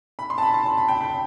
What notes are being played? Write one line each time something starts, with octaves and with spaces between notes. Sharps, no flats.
B5
C6
A5
B5
A5
A5
B5
G5
B5